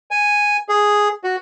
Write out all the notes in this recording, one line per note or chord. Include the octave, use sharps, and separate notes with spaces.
G#5
G#4
F#4